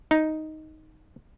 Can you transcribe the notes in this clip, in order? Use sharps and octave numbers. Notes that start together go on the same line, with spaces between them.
D#4